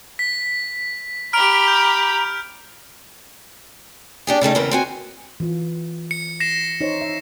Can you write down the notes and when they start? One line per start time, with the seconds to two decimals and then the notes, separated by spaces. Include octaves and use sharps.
0.19 B6
1.33 G4 A#5 B5 F6 D7
1.68 G6
4.27 D4 G4 G#4
4.41 C#3 G3 A3 D#4
4.55 E2 C#3 C4 A#4 B4
4.71 C4 F#4 G#5
5.40 E3 F4
6.11 C#7
6.40 A#6 C7 E7
6.81 D#4 C5 C#5
7.01 E5